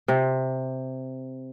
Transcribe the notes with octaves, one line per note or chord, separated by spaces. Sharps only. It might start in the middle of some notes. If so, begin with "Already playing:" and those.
C3